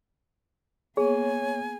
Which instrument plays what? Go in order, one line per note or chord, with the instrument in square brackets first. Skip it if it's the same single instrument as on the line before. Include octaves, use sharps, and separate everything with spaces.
[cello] A#3 B3 [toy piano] G#4 [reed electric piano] C#5 [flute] G#5